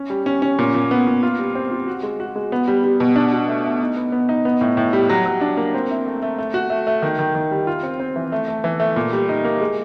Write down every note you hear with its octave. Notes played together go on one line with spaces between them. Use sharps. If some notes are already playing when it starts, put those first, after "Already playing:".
Already playing: C#4
G3
C#4
C#4
A#2
A#2
B3
A#2
F4
G3
C4
F4
F#4
G#3
F#4
G#3
B3
G3
G3
B2
D4
F#4
A3
A3
D#4
B3
B3
D#4
B3
A2
A2
G3
F#3
F#3
D4
A#3
C4
E4
A3
A3
A3
F#4
A3
A3
D#3
D#3
D#3
G3
F4
C4
C4
E3
A3
A3
E3
A3
A#2
G3
D#4
A#3
G#3